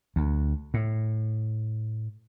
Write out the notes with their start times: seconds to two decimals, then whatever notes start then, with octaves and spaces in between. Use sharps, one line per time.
0.16 D2
0.74 A2